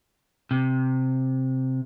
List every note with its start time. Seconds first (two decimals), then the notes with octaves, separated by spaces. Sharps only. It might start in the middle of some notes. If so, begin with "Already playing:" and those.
0.51 C3